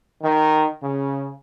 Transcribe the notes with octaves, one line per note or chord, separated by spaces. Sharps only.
D#3
C#3